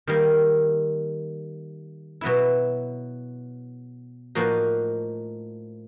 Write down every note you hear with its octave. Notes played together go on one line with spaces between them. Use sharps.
D#3 G3 A#3
B2 F#3 B3 E4
A2 F3 A#3 D#4 F#4